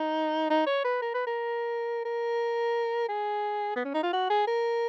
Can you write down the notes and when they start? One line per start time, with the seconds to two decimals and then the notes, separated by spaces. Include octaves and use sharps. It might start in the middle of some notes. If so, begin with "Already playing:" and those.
Already playing: D#4
0.50 D#4
0.66 C#5
0.84 B4
1.02 A#4
1.14 B4
1.27 A#4
2.05 A#4
3.09 G#4
3.76 B3
3.85 C#4
3.94 D#4
4.03 F4
4.13 F#4
4.30 G#4
4.47 A#4